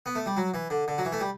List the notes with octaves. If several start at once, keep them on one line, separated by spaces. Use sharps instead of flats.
B3
A3
G3
F#3
E3
D3
D3
F#3
E3
A3
G3